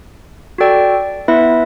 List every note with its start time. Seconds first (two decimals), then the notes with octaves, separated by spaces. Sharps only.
0.58 F#4 A4 D5 G5
1.28 B3 E4 B4 E5